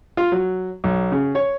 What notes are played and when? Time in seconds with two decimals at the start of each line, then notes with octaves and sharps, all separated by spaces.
0.17 F4
0.32 F#3
0.84 B1
1.12 C#3
1.35 C#5